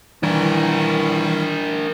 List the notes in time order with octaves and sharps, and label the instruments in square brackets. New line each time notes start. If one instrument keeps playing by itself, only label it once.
[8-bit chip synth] D#3 G3 [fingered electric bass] E3 [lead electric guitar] D4 A#4